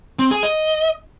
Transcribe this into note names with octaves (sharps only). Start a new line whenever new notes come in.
C4
G#4
D#5